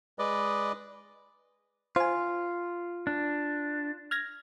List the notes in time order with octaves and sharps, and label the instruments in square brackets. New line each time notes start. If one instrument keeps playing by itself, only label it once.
[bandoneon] G#3 B4 D5 D#5
[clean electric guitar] F4 [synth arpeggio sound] C5 G#5
[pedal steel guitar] D4
[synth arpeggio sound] F6 G#6 A#6